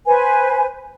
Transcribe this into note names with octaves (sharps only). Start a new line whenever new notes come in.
B4 C5 G#5